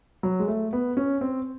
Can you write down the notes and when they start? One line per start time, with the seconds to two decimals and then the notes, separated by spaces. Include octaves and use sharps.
0.23 F#3
0.39 G#3
0.48 A3
0.73 B3
0.97 C#4
1.21 C4